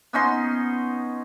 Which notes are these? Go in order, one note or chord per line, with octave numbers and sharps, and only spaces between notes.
B3 C#4 D#4 C6